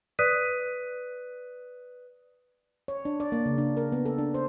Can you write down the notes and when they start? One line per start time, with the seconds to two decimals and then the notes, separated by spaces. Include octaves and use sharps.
0.19 B4 D5 D#6 F#6 B6 D#7
2.88 C#5
3.05 D4
3.20 D5
3.32 A#3
3.46 C#3
3.58 D4
3.77 A#4
3.92 B3
4.06 A4
4.18 D4
4.34 C5